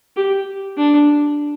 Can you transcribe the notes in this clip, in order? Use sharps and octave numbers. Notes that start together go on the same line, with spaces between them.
G4
D4